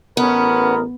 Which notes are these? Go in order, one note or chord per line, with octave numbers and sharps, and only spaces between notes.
A1 B3 C#4 A#4 B5 D#6